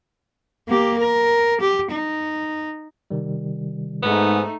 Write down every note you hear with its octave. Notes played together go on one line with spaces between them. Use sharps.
A#3 G4
A#4
G4
D#4
C3 D#3 G3
G#2 A3 B3 D#4